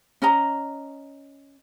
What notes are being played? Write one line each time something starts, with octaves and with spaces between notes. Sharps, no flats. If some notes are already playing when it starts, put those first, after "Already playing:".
C#4 D#5 A#5